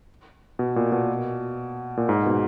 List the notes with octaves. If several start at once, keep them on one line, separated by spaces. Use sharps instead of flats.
B2
A#2
B2
A#2
G#2
B2